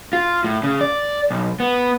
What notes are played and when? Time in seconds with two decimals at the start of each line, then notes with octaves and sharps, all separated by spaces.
0.13 F4
0.44 A2
0.63 C#3
0.81 D5
1.31 B1
1.60 B3